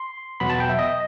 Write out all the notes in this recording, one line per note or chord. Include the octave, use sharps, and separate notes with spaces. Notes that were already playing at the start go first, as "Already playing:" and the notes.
Already playing: C6
E2 B2 F#3 B3 B5
A5
G5
E5
D#5